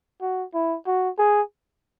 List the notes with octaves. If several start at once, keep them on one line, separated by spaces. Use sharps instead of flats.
F#4
E4
F#4
G#4